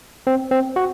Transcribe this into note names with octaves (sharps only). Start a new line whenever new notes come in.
C4
C4
F#4